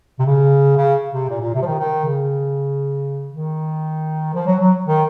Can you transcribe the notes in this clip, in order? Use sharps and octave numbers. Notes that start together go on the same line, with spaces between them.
C3
C#3
C#3
C3
A#2
A#2
C3
F3
D#3
D#3
C#3
D#3
F3
F#3
F#3
D#3